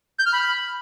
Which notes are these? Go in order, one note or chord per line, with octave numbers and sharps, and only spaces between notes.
G6
F6
B5